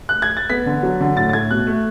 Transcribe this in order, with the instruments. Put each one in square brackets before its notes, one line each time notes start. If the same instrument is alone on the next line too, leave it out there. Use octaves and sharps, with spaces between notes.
[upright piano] F#6
G#6
A6
B3 B6
D3
F#3
D3
A2 A6
A6
A2 G#6
B2 F#6
A3